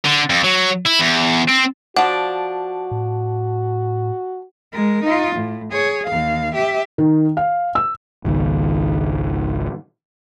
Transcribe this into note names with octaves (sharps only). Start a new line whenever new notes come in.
D3
F2
F#3
E4
E2
C4
F3 D4 F#4 F#5
A2
G#3 A#4
D#4 F4
A2
G#4 C#5
D#2 F5
G4 E5
D#3
F5
E6
G#1 C#2 D#3